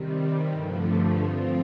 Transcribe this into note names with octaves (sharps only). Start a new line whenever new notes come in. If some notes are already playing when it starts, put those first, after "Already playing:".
Already playing: C3 D#3 G3
G2 D3 F3 A3
F3 C4 F4